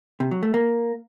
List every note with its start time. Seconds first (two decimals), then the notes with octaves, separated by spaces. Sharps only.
0.20 C3
0.31 F#3
0.43 A3
0.54 A#3